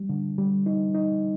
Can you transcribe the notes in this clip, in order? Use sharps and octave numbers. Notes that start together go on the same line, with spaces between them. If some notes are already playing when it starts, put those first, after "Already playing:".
Already playing: G3
D3
G3
D#4
D#4